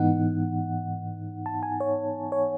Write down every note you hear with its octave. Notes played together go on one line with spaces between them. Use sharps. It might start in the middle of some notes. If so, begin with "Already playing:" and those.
Already playing: G#2 E3 B3 D#4 F#5
A5
G#5
C#5
C#5